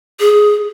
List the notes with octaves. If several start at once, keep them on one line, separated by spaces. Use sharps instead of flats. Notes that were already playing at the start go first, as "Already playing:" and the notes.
G#4